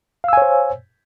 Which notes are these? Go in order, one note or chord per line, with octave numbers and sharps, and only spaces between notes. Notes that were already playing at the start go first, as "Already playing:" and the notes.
C5 C#5 F5 G#5 E6